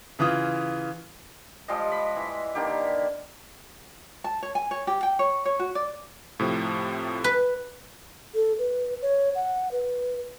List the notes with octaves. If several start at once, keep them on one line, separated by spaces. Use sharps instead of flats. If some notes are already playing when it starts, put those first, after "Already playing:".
C#3 E3 F4 D#6
F3 G3 G#3 D#5
B5
E3
D3 D#3 A#3 G4
A5
C#5
G#5
C#5
G4
G5
C#5
C#5
F#4
D5
A2 C3 F3
B4
A4
B4
C#5
F#5
B4